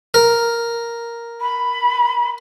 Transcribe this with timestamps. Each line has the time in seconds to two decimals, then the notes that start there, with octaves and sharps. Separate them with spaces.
0.14 A#4
1.40 B5